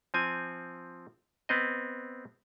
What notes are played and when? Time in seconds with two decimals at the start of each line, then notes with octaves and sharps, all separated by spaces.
0.14 F3 C4 G#5
1.49 B3 C4 D#5